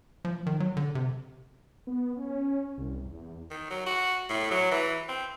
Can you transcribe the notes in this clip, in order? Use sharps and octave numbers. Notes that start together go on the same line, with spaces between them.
F3
D#3
F#3
D3
C3
B3
C#4
C2
E2
D#3
F#3
F#4
A2
F#3
E3
C4